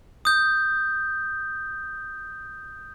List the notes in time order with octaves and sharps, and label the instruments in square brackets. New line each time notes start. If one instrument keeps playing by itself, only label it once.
[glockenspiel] D#6 G6